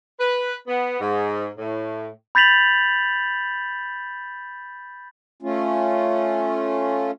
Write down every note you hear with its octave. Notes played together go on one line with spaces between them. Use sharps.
B4
B3
G#2
A2
B5 G6 A6 B6 F7 F#7
A3 C#4 F4